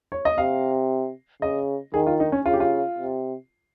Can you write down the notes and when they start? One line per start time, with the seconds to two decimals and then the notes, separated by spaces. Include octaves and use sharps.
0.12 C#5
0.25 D#5
0.38 C3 F5
1.42 C#3 D#5
1.94 D#3 G#4
2.07 F4
2.20 D#4
2.32 C#4
2.46 C#3 F4
2.53 G4
2.60 F4
2.98 C3